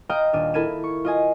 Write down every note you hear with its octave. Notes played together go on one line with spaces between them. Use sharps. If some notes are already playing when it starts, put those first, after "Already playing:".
D#5 F5 G5 A#5 D#6 F6
D#1 D4 F6 D#7
E4 A4 A#4 G#6 D#7 E7
C#6
F4 D#5 G#5